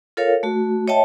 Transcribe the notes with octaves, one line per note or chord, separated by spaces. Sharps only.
F4 A4 A#4 C#5 F5
A3 F#4
C#5 D#5 E5 G5 A5